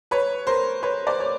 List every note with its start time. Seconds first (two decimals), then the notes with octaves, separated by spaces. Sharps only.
0.11 B4 C#5
0.47 A#4 C5
0.83 B4 C#5
1.07 C5 D5
1.20 C#5